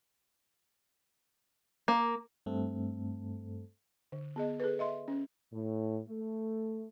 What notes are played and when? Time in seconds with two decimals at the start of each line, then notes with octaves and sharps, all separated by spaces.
1.88 A#3
2.46 G2 A3 C4 A4
4.12 D3
4.36 B3 G#4 D#5
4.60 G#4 A4 B4
4.79 D#5 E5 C6
5.08 C#4
5.53 A2
6.08 A3